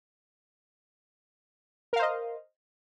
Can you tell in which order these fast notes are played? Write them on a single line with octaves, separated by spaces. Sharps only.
A#4 F5 C5 D#5